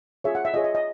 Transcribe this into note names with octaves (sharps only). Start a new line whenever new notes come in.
F4 G#4 C#5 E5
F#5
E5
F4 G#4 C#5 D#5
D#5
D#5